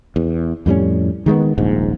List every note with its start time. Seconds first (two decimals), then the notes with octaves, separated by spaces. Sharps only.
0.16 E2
0.66 F2 A2 G3 C#4
1.26 D#3 G#3 A3 B3
1.58 D#1 A#1 G#2